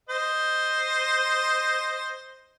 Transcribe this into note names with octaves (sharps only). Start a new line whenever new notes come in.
C5 D#5